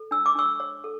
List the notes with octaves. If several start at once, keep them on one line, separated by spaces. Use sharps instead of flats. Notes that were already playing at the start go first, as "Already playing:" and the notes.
Already playing: A4
D4 E6
D6
D4 C#6 E6
C#5
A4